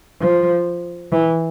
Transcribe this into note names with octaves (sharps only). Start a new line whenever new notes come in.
F3
E3